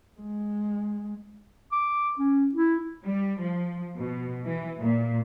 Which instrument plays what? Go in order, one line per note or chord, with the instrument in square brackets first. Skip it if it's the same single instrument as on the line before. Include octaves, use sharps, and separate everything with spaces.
[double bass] G#3
[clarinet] D6
C#4
E4
[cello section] G3
F3
B2
E3
A#2